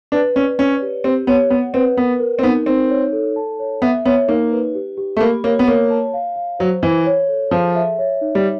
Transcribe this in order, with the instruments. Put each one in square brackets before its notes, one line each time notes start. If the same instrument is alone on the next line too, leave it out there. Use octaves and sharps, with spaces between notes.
[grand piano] D4 [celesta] B4
[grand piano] C#4 [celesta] D5
[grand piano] C#4 [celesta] C#5
[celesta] G4
[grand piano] C4 [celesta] G4
[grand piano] B3 [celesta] C#5
[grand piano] B3 [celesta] F#5
[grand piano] C4 [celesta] B4
[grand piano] B3 [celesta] A#4
[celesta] A#4
[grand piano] C4
[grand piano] B3 [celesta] D#4
[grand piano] C4 [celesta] D#4
[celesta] C#5
A4
A5
C#5
[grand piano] B3 [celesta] E5
[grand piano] B3 [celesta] C#5
[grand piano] A#3 [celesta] D#4
[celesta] B4
G4
G4
[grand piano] A3
[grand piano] A#3 [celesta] B5
[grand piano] A#3 [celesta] C#5
[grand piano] B3
[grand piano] A#3 [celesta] C#5
[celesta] A5
F5
F5
[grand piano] F#3 [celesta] C5
[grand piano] E3 [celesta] C5
[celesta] C#5
A4
[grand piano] F3 [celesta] G#4
[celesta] E5
C#5
D#4
[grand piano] G3